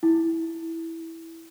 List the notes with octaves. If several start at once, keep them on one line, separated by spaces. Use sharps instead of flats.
E4